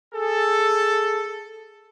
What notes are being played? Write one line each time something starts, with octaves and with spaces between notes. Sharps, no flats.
G#4 A4